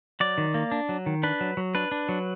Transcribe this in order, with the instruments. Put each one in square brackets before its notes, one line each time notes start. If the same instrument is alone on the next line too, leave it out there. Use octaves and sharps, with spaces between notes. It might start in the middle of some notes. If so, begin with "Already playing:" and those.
[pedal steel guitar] F#3 D5
D#3
A#3
D4
F#3
D#3
D4 B4
F#3
F#3
D4 B4
D4
F#3